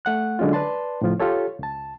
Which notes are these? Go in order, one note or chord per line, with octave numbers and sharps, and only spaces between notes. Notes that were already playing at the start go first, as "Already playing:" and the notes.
A3 F#5 F#6
D3 F#3 G#3 C#4 F4
B4 D5 A5 C6
A2 C#3 F3 F4
F4 G4 A4 C#5
C#2 A5